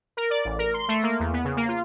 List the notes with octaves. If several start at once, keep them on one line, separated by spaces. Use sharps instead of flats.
A#4
D5
A1
A#4
C6
A3
A#3
E2
B3
C#3
A#3
F4